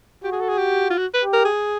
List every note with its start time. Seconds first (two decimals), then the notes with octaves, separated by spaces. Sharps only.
0.24 F#4 G4
0.32 G#4
0.41 A4
0.49 G#4
0.58 G4
0.90 F4
0.98 F#4
1.14 B4
1.24 G4
1.34 A#4
1.45 G#4